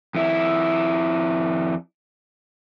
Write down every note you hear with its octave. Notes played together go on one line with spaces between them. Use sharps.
F2 E4